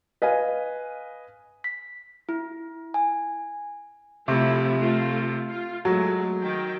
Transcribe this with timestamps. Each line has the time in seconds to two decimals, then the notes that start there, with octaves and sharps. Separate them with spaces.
0.22 B4 D#5 F5 G#5
1.64 B6
2.29 E4
2.94 G#5
4.28 C3 F3 A3 E4
4.78 A3 F4
5.48 F4
5.85 F#3 G#3 A3
6.43 D#3 G5